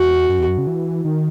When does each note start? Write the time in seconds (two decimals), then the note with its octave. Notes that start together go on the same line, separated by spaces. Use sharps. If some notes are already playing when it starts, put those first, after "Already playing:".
Already playing: E2 F#4
0.30 F#2
0.39 E2
0.48 F#2
0.58 C#3
0.67 E3
1.05 D#3